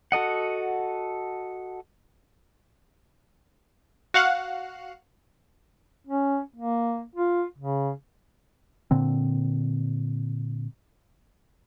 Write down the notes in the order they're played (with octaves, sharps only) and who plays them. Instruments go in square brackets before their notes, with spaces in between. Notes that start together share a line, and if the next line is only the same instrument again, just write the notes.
[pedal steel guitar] F#4 A4 D#5 F#5
[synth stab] F#4 F5 F#5 F#6
[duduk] C#4
A#3
F4
C#3
[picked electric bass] A#2 D3 C4